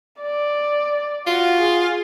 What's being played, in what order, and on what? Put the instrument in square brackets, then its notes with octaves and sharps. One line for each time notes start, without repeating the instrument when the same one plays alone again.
[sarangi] D5
[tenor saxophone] F4 [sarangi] F#4
[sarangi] G#4